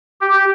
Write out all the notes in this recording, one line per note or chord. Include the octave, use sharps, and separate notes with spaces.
G4